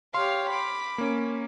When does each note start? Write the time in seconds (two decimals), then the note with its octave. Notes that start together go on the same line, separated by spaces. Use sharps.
0.14 G4 C#5 F5 C6
0.50 B5 D6
0.98 A#3 C#4